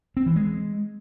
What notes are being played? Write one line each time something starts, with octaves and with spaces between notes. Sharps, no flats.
C4
E3
G#3